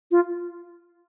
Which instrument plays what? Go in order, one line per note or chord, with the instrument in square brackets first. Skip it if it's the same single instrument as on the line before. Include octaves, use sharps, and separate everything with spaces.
[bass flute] F4